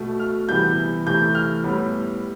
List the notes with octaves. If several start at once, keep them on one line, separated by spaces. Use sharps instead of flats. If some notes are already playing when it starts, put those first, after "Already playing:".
Already playing: B2 A3
F6
C3 E3 G3 B3 G6
C3 E3 A3 G6
F6
A2 G3 B3